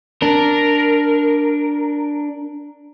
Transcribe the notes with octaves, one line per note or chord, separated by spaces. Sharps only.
D4 A#4